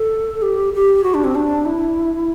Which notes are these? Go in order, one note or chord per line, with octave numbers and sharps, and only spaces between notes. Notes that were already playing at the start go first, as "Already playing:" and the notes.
Already playing: A4
G4
G4
F#4
D4
C4
D4
E4